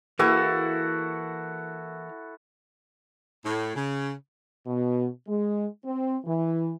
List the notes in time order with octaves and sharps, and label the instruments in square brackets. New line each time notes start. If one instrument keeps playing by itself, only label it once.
[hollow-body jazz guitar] E3 A#3 G#4 [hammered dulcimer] E4 F#4 A4
[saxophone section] A2
C#3
[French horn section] B2
G#3
C4
E3